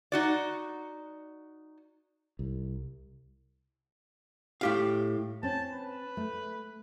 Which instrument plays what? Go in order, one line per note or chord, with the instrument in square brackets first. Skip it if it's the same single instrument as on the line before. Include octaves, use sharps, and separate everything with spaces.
[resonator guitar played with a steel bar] D#4 F#4 D5
[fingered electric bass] C2
[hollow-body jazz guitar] A2 G4 F5
[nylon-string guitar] C4 C#4 [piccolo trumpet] A5
[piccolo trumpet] B4
[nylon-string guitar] A3